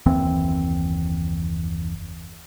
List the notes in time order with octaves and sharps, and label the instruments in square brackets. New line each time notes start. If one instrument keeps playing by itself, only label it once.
[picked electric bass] F#1 D#2 E3 C4